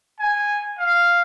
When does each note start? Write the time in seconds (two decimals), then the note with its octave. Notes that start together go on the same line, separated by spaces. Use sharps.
0.19 G#5
0.78 F5